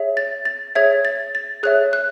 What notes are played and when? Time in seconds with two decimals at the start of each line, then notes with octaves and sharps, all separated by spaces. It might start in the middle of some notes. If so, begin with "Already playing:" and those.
Already playing: G#4 C#5 E5
0.17 A6
0.45 A6
0.75 G#4 C#5 E5 G#6
1.05 A6
1.35 A6
1.63 G#4 C#5 E5 F#6
1.93 F#6